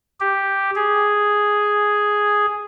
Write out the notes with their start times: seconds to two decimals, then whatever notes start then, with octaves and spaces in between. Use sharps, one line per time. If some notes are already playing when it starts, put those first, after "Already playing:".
0.20 G4
0.76 G#4